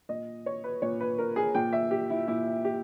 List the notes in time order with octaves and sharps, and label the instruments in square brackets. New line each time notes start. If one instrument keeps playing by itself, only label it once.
[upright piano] A#2 D#5
C#5
B4
A#2 C#5
B4
A#4
G#4
A#2 G5
E5
G4
E4
A#2 E4
G4